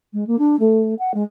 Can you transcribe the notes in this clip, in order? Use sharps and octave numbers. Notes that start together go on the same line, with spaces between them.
G#3
A#3
D4
A3
F#5
G#3